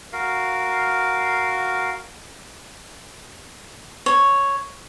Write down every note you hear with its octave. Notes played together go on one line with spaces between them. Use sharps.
F#4 A#4 F5
C#5